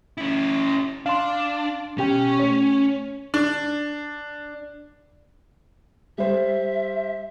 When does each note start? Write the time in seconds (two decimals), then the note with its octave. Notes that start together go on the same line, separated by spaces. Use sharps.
0.18 C#4 E4
1.06 D4 F5 C6
1.98 B2 C#4 G4 G5
2.39 A3 C#5
3.34 D4
6.18 G3 C5 E5